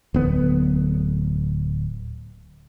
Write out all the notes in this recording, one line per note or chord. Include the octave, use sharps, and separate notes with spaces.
D1 B3